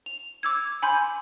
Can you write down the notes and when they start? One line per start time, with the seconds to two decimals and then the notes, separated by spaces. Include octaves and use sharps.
0.06 F7
0.43 D6 E6 G#6
0.82 G#5 B5 C6 G6